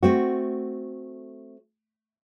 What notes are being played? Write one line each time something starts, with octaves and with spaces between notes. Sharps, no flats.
A3 C4 F#4